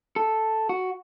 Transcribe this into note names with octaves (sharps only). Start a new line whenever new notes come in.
A4
F#4